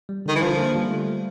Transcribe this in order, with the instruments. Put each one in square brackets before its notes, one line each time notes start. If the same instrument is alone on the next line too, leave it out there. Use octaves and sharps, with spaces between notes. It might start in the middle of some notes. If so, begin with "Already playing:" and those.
[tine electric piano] G3
[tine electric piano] D3 [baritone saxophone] D#3
[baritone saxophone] E3
[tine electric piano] D3 [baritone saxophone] F3
[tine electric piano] A#3
G3
A3